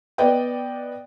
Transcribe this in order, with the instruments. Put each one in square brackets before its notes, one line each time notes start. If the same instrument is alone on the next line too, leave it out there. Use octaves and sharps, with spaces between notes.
[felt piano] B3 D5 D#5 G5